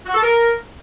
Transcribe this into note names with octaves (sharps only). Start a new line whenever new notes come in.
F#4
A4
A#4